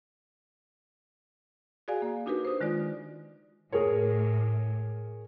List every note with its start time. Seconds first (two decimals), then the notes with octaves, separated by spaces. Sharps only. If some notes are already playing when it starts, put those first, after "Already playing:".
1.88 F#4 G#4 D5 F5 G#5
2.02 A#3
2.26 D4 D#4 F#4 G4 A#4 B4
2.45 C5 D#6
2.61 D#3 G#3 F4 D5
3.72 A2 G#4 A#4 C#5